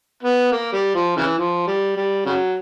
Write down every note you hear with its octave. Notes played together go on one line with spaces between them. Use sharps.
B3
A#3
G3
F3
C#3 E3
F3
G3
G3
C#3 F#3